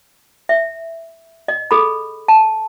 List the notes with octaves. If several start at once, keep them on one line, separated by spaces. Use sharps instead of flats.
E5
D#5
G#4 A4 B5
A5